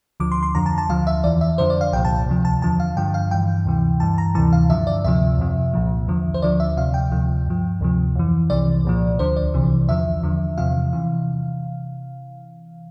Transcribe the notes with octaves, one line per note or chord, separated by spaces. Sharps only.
D2 D3 F3 D6
C6
C6
F2 D3 F3 A#5
A5
A5
D2 D3 F3 F5
E5
E2 E3 D5
E5
F2 D3 F3 C5
D5
F5
C2 A#2 F3 G5
A5
D2 C3 F3
A5
E2 D3 F3 A5
F5
G2 D3 F3 G5
F5
G2 E3 G5
D2 C3 E3
G2 E3 A5
A#5
D2 C3 E3 A5
F5
G2 D3 F3 E5
D5
D2 C3 F3 E5
F2 C3 F3
C2 A#2 F3
E2 D3 F3
C5
D2 D3 F3 D5
E5
D2 C3 F3 F5
G5
D2 C3 F3
G2 F3
D2 C3 F3
F2 E3
C2 C3 E3 D5
C2 A#2 F3
D2 D3 F3 C5
D5
C2 C3 E3
E2 D3 F3 E5
E2 D3 F3
E2 C3 F3 F5
C3 E3